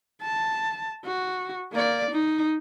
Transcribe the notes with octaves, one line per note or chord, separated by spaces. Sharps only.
A5
F#4
A#3 D5
D#4